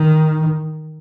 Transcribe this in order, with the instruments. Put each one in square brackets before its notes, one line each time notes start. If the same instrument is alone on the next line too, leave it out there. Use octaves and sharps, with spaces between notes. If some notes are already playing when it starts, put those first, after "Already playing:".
Already playing: [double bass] D#3